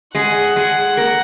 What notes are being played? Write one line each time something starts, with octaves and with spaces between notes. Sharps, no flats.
G#3 G#4 F#5
G#3 G#4
A#3 A#4